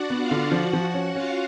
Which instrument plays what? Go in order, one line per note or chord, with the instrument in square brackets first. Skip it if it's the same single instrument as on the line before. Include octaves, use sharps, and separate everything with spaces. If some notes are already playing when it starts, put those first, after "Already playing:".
Already playing: [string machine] D4 F#4 D5 F#5
[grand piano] B3
[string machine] F4 F5
[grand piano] D3
[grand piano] F3 [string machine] F#4 F#5
[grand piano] F3
[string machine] F#4 F#5
[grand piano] C#4
[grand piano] C#4 [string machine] F4 F5